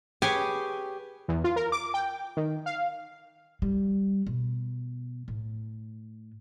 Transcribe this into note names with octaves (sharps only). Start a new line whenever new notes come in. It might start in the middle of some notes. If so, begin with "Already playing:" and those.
G4 G#4 B4 C#5 G5 G#5
E2
F4
A#4
D6
G5
D#3
F5
G3
B2
A2